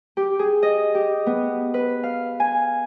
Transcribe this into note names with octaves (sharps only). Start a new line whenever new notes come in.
G4
G#4
D#5
G4
B3
B4
F5
G#5